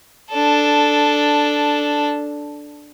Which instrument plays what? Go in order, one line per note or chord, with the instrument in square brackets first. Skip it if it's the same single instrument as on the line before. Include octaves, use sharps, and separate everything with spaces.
[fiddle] D4 A4